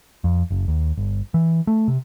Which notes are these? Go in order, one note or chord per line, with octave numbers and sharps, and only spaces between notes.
F2
F#1
D#2
G1
E3
A3
C3